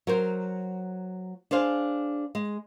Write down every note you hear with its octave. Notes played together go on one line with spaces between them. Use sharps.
F#3 A#4 C5
D4 G#4 C5 F5
G#3